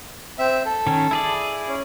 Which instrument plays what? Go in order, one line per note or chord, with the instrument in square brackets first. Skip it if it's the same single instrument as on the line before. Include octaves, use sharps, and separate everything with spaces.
[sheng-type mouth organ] C4 E5
A4
[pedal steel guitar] D#3 C#4
E4 G#4 D5
[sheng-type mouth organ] C#4